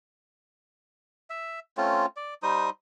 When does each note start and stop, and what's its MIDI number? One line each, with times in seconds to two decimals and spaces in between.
1.30 1.60 76
1.77 2.06 57
1.77 2.06 60
1.77 2.06 61
1.77 2.06 65
2.16 2.34 74
2.43 2.70 55
2.43 2.70 63
2.43 2.70 72
2.43 2.70 87